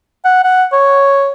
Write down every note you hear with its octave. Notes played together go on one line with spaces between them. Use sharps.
F#5
F#5
C#5